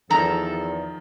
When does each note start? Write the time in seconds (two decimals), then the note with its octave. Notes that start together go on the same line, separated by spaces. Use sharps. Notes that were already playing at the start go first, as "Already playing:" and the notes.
0.11 E2 D#3 F3 E4 A4 A#5